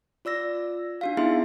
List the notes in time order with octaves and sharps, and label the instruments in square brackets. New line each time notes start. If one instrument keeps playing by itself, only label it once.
[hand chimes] F4 D5 E6 A#6
D4 F#4 F5
B3 D#4 E4 G#4 E5 C6